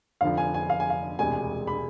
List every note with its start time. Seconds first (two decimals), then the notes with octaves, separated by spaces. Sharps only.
0.21 F1 F2 D3 F3 F5
0.37 G#5
0.54 G#5
0.70 F5
0.80 G#5
0.90 F5
1.19 E1 D2 C3 G#3 G#5
1.67 B5